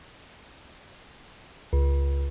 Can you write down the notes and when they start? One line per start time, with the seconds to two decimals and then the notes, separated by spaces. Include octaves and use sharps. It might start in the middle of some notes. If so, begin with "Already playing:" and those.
1.73 C#2